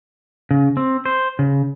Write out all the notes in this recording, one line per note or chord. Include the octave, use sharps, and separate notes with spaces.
C#3
C4
C5
C#3